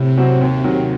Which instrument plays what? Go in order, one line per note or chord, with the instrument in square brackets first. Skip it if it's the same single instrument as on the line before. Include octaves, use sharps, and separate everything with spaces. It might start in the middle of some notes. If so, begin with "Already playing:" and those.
Already playing: [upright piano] A2 [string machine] C3
[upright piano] F#3 C4 F#4
D#2
D#3 F#3